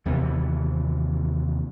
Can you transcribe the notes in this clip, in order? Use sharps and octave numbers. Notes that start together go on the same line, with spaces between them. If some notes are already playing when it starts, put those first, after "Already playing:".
D#2 C3 E3 B3